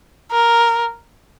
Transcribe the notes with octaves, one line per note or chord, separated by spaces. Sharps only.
A#4